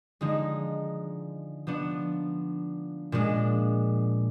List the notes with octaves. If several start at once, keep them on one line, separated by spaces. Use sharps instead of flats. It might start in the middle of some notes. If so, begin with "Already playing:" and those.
D3 F3 G#3 D#4
F3 B3 D4
A#2 F3 G#3 D4